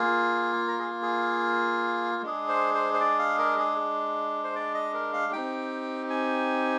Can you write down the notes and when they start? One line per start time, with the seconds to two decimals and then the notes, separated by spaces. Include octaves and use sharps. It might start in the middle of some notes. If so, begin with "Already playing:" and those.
Already playing: A#3 F4 G#4
0.68 A#4
0.79 G#4
1.02 G#4
2.22 G#3 D4 G#4
2.48 C5
2.74 C5
2.94 C5
3.00 D5
3.19 F5
3.39 A#4
3.58 G#4
4.44 C5
4.55 D5
4.74 D#5
4.94 A#4
5.13 F5
5.33 C4 D#4 G4 G5
6.10 G#5